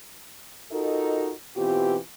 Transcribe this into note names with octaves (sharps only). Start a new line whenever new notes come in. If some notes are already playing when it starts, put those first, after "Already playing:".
D#4 F4 F#4 A4 A#4 D#5
B2 E3 C4 F4 G4